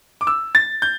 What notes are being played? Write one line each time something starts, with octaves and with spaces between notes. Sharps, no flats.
D6
E6
A6
G6